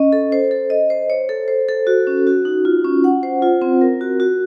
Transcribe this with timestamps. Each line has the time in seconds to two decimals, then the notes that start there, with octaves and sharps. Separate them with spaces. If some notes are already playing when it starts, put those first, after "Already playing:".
Already playing: C#4 D#5
0.13 A4
0.32 C5
0.51 A4
0.70 D#5
0.90 C5
1.10 C#5
1.29 A4
1.48 C5
1.69 A4
1.87 F#4
2.07 C#4
2.27 F#4
2.45 D#4
2.65 F4
2.85 C#4
3.04 F#5
3.23 C5
3.42 F4
3.62 C4
3.81 A#4
4.01 F#4
4.20 F#4